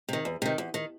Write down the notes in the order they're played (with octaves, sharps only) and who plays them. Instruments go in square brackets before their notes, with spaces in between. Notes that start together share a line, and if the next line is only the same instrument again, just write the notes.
[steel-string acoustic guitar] C3 D#3
E2
C3 D#3
E2
D#3